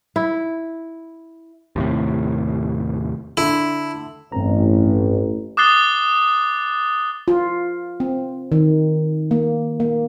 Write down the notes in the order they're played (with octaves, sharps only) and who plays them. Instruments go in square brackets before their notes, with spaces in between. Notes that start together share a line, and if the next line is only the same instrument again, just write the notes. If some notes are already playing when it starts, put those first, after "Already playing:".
[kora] E4
[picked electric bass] D#2 A2 C3
[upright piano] D3 [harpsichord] E4
[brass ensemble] A1 [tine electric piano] G2 C4 A#5
[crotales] D6 D#6 F#6 A6 C7 G7
[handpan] F4
C4
D#3
A#3
A#3